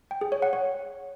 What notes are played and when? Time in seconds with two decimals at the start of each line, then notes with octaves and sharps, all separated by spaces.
0.11 G5
0.21 G#4
0.32 C#5
0.42 F#5
0.53 C#5